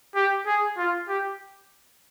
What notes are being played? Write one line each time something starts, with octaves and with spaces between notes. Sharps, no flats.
G4
G#4
F4
G4